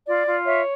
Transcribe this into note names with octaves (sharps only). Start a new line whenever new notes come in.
F4 D5
F4
C#5 E5